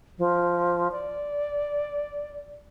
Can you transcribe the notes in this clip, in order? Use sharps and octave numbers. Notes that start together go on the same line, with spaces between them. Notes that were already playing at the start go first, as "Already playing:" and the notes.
F3
D5